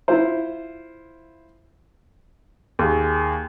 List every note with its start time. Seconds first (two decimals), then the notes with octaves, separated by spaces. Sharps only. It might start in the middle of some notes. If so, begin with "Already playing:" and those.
0.08 E4 F4 C5
2.79 D#2 G#4